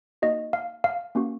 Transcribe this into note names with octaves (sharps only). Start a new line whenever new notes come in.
A#3 D#4 F#4 D#5
F5
F5
A#3 C#4 F#4